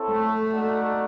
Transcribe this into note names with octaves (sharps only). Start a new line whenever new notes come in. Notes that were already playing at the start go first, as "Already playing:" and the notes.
Already playing: C4 E4 A4 C#5
A3
D#4 F#4 A4 D5 F#5